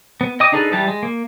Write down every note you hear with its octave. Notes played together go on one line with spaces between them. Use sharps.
B3
D#5 G5 D6 D#6
D4 D#4 G#4 A4 B4
E3 G3 G4 A5
G#3
A#3